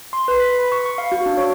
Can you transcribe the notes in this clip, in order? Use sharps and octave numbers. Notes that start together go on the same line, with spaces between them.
C6
B4
B6
B5
C#6
C#6
F5
F#4
D4
C#5